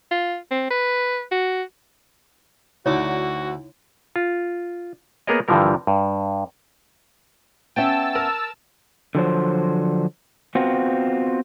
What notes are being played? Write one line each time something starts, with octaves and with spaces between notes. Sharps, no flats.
F4
C4
B4
F#4
D2 D3 D#4 E4 F#4 C#5 D6
F4
A#3 B3 G#4 A#4 C#5 D#5
G2 D3 E3 F3 G3 A#4
G2
B3 C#4 E5 G5 A5 E6
A#4
D3 F3 F#3 C5
B3 C4 F4 F#4